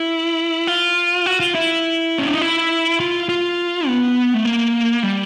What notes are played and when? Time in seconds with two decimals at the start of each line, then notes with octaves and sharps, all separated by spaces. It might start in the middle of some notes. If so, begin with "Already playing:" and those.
Already playing: E4
0.67 F4
1.26 F#4
1.40 F4
1.55 E4
2.18 C#4
2.27 D4
2.34 D#4
2.41 E4
3.00 F4
3.29 F4
3.87 B3
4.34 A3
4.45 A#3
5.03 G3